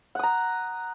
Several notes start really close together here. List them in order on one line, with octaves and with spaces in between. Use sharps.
F#5 D#6 A#5